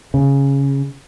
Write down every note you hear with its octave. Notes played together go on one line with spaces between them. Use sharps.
C#3